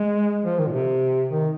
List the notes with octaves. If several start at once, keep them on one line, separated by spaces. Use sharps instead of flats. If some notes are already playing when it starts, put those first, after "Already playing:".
Already playing: G#3
F3
D#3
A#2
C3
D#3